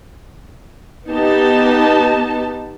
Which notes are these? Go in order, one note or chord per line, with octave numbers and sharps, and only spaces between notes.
B3 D#4 G4 A5